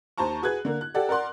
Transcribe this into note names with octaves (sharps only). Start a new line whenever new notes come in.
D#2 C5 A5 A#5 C#6
F#4 G#4 B4 F#6 G#6
D3 A#3
F#6
G4 A4 D5 F#5
A#4 D5 F#5 C6 F#6